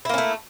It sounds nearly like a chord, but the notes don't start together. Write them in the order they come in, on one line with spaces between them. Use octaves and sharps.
E4 A#3 C#4 A3